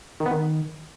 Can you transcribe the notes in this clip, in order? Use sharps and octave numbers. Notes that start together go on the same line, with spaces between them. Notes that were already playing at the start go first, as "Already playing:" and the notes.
D#3
B3
D#3